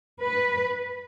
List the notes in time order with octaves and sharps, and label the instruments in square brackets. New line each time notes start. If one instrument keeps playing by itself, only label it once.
[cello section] B4